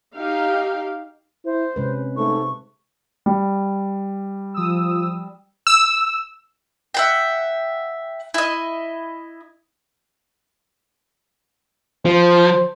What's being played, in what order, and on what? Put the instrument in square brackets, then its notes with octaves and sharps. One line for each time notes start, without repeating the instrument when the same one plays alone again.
[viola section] D#4 G4 F5
[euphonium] E4 [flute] C5
[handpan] C3 G#3 B4 [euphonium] C#4
[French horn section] G#2 A3 [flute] C#6
[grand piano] G3
[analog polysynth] F3 D#6 E6
[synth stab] E6
[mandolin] E5 F#5 G5
E4 D#5
[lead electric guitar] F3 [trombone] C5